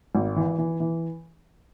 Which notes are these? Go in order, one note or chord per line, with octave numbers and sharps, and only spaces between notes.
G#1
E3
E3
E3